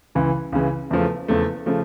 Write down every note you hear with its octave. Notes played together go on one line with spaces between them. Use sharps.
C#2 C#3 E3
C#2 C#3 E3
E2 C#3 F3 A3
E2 C#3 F3 A3
C#3 F3 A3